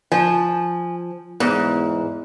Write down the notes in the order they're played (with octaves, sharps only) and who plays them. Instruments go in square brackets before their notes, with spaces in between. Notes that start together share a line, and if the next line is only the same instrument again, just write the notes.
[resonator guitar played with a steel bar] F3 [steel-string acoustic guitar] G#5
[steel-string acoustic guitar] E2 [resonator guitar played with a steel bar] G#2